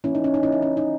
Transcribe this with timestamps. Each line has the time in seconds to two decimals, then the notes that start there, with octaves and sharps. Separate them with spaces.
0.04 E3 A#3 C#4 E4
0.15 D#4
0.24 C#4
0.34 D#4
0.43 C#4 E4
0.52 D#4
0.62 C#4
0.77 D#4